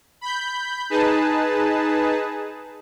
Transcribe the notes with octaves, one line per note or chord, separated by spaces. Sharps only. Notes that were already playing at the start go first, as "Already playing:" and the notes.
B5 G6
D#4 G#4 B4 A5